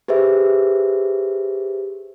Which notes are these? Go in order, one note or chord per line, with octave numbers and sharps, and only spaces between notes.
G4 G#4 B4 C5 E5